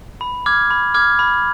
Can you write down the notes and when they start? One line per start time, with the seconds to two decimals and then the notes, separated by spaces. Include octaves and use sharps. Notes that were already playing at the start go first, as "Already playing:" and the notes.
0.21 B5
0.46 D6 F6 G#6
0.71 B5
0.94 D6 F6 G#6
1.19 B5